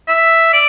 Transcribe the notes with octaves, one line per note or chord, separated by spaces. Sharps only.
E5
D5